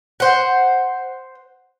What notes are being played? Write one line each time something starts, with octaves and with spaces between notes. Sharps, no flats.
C5 F#5